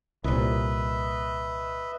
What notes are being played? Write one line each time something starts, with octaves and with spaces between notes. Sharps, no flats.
C2 A#2 B4 D#5 E5